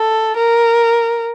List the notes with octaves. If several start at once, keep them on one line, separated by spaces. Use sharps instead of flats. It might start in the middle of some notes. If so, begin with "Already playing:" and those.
Already playing: A4
A#4